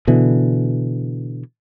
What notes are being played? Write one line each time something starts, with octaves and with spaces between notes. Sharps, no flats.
B2 D3 E3